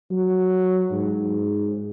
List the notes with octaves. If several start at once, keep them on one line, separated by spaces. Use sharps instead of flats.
F#3
G#2